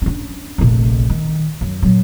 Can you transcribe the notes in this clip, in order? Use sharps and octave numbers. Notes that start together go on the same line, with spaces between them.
C#4 D4
F1 A#1
D#3
F#2
A#2 F#3